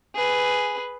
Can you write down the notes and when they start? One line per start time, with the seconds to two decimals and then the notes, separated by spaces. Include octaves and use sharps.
0.14 G#4 B4